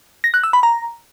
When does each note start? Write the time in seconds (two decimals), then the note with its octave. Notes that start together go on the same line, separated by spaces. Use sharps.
0.24 A#6
0.34 F#6
0.44 E6
0.53 B5
0.63 A#5